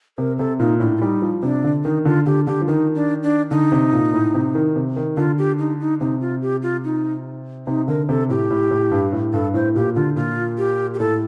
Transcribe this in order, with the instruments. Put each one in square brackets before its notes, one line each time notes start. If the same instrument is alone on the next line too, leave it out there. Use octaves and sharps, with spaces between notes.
[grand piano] C3 [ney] A#4
[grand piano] C3 [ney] A4
[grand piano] A#2 [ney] D#4
[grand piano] A2 [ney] D4
[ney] F4
[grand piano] G3 [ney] D#4
[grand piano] F3
[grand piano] C3 [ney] D4
[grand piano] D3
[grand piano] D#3 [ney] D#4
[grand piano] D3 [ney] F4
[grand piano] D3 [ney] G4
[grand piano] D3 [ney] G4
[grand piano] F3
[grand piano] D#3 [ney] D#4
[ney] D4
D4
[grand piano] D3 [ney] D#4
[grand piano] C3
A#2
A2
C3
D#3
C3
D#3
[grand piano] D3 [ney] F4
[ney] G4
D#4
D#4
[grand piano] C3 [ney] D#4
[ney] F4
G4
F4
D#4
[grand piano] C3 [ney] D#4
[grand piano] D3 [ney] A#4
[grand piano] C3 [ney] A4
[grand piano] A2 [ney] G4
[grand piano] A2
A2
G2
A2
[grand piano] G2 [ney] A4
[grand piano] A2 [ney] C5
[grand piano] A#2 [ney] G4
[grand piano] D3 [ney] F4
[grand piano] A#2 [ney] F4
[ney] G4
G4
[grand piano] A2 [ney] A4